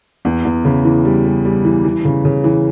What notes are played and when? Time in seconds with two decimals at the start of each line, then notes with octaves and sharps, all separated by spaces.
0.25 E2
0.45 E2
0.65 C#3
0.85 E3
1.05 G3
1.25 G3
1.45 G3
1.65 E3
1.85 E3
2.05 C#3
2.25 C#3
2.44 E3